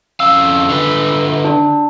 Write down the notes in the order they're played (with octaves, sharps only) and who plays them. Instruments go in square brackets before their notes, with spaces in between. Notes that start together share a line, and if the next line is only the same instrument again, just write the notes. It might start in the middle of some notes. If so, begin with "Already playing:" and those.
[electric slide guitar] F2 C#4 F5 [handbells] E6
[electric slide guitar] D3 B4
[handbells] D4